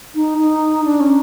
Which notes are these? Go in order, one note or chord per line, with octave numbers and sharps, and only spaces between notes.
D#4
D#4
D4
C#4